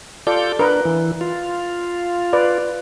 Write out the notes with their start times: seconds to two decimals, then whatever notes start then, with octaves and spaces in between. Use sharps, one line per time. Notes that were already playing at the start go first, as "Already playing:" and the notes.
0.27 F4 A4 D5 G6
0.59 D4 A#4 B4
0.85 E3
1.21 F4
2.33 B4 D5